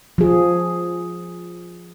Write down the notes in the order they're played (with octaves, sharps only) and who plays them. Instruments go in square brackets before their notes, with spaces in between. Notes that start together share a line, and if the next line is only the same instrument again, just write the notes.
[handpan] F3 G#4